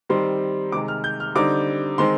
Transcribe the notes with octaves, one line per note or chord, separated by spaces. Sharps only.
D#3 G3 C4 C6
C3 D#3 G#3 D6
F6
G6
F6
D3 G3 C4 D#4 D6
D#3 G#3 C4 C6